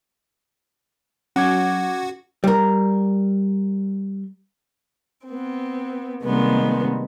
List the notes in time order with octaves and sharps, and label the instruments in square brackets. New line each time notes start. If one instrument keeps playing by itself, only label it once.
[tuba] F#3 [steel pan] C#4 [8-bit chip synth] F#4 [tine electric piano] F#5 D6 G#6
[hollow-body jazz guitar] G3 A#4
[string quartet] B3 C4
C3 D#3 G3 G#3 A#3 B3